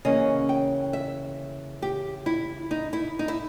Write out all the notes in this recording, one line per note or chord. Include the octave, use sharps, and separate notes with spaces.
C#3 E3 A#3 C#4 D#5
G5
E5
G4
E4
D#4
E4
D#4
E4